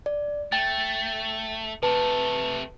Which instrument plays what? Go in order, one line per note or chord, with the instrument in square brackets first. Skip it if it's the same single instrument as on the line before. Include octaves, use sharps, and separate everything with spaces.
[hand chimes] D5
[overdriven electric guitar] A3 [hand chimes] G5 A6
[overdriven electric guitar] C3 A3 [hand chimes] B4 A5